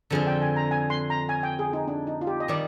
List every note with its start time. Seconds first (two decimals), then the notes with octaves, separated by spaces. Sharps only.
0.10 F2 D3 F3 C4 G#4
0.27 G5
0.42 G#5
0.56 A#5
0.71 G#5
0.90 C6
1.10 A#5
1.29 G#5
1.43 G5
1.59 G#4
1.73 D#4
1.88 D4
2.07 D#4
2.21 F4
2.27 G4
2.40 D#5
2.48 D#3 G3 D5